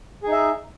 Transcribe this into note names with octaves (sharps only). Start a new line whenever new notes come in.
D#4 G#4 E5